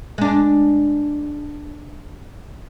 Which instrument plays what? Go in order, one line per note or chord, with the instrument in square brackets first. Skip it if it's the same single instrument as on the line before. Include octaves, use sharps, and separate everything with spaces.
[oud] G#3 D4